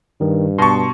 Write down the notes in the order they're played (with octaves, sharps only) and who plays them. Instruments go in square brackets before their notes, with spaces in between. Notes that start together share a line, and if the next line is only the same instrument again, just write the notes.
[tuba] G2 [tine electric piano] D#3
[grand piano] B2 C#6 [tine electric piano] A5 C6